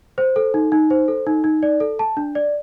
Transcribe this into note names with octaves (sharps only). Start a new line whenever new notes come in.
C5
A4
D#4
D#4
C5
A4
D#4
D#4
D5
A4
A5
D4
D5